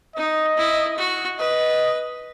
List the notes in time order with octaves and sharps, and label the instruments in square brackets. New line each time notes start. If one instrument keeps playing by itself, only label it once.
[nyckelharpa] D#4 [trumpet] D#5
[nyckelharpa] E4
F#4
[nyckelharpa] B4 [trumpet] D#5